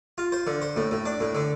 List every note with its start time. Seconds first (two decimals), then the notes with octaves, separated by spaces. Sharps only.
0.18 F4
0.32 C5
0.47 D3
0.62 C5
0.76 A2
0.91 A2
1.05 D4
1.20 A2
1.35 D3